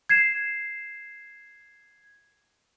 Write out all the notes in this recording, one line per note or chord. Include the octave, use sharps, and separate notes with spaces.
G#6 C7 E7